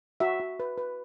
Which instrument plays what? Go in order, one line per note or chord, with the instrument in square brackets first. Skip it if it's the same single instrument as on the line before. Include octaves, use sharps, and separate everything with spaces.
[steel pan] F#4 E5
F#4
B4
B4